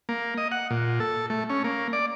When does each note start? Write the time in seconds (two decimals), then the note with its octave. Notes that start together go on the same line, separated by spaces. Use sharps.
0.09 A#3
0.38 D#5
0.52 F#5
0.71 A#2
1.00 A4
1.30 A3
1.50 C#4
1.64 A#3
1.93 D5